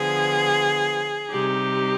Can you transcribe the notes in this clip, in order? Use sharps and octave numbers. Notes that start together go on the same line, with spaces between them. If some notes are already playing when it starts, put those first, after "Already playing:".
Already playing: D3 F3 B3 G#4
C3 G3 C4 D#4 G4